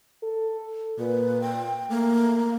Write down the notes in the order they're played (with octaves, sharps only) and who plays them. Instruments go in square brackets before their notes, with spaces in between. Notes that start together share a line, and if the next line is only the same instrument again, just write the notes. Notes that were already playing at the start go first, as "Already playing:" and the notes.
[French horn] A4
[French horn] A#2 [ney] B4
[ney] G5
[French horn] A3 [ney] A#3